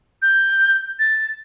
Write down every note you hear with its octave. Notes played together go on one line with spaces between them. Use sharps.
G6
A6